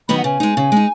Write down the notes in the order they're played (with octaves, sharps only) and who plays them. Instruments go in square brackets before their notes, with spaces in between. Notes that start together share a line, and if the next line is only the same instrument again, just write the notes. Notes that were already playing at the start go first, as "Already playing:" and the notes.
[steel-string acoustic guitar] D#3 F#3 B3 D#4 [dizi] B5
[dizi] F#5
[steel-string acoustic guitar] C#3 [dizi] G#5
[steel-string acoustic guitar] G#3 D#4
C#3
G#3 D#4